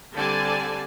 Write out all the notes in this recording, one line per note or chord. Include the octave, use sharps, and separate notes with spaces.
D3 G3 C4 D5 G#5 A5